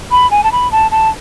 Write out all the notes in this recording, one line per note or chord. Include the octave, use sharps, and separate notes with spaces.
B5
G#5
A5
B5
A5
A5